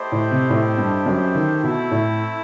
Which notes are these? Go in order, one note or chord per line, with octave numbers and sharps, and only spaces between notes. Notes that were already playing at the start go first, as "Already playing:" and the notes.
Already playing: A3 E4 G4 C5 D#5
A2
C3
A2
G2
F#2
D#3
B2 A3 C4 E4
A2